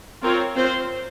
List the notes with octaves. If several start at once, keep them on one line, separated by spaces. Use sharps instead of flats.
C4 F4 A#4 C#5
C4 F4 C5